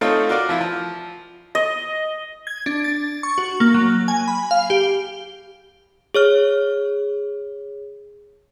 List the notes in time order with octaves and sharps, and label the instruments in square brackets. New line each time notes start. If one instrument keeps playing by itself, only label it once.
[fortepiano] A3 C4 D#4 F4 A4 C#5
F4 F#4 A#4 D5
F3 E4 F4
F3
[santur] D#5
[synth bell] G#6
D4
A6
C#6
F#4
A#3
F#3
G#5
B5
F5
G4
[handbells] G#4 C#5 F6